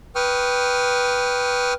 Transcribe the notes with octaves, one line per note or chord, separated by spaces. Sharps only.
B4 G5 C#6 D#6 F6